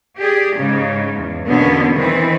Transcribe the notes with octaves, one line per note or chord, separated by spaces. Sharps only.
G4 G#4 D5
G#2 C#3 G#3 D#4
E2
E2 B2 D3 A#3 B3 C#4
D#3 E3 C4 B4